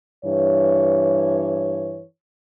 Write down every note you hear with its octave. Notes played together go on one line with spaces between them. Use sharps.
G2 E3 C#5